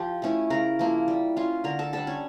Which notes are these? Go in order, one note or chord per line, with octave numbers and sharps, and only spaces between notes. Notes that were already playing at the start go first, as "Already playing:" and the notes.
Already playing: F3 G4 G5
A3 C#4 E4
C#3 A#4 A#5
F3 A#3 E4
G3
C#4 F4
D3 A#4 A#5
A4 A5
G3 D4 A4 A5
C#4 C#5